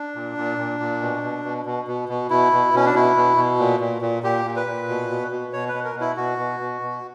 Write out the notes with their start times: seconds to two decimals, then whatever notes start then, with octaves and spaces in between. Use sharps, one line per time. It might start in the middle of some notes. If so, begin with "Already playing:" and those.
Already playing: D4
0.15 A#2
0.37 A#2
0.58 A#2
0.80 A#2
1.02 B2
1.23 B2
1.45 B2
1.66 B2
1.88 B2
2.09 B2
2.30 B2 E4
2.52 B2
2.74 B2 C#4
2.85 D4
2.94 B2 E4
3.16 B2
3.37 B2
3.59 A#2
3.80 A#2
4.02 A#2
4.23 A#2 G4
4.46 A#2
4.56 B4
4.67 A#2
4.88 B2
5.10 B2
5.31 B2
5.53 B2 C#5
5.68 B4
5.74 B2
5.85 A#4
5.95 B2
6.01 E4
6.17 B2 F#4
6.38 B2
6.60 B2
6.81 B2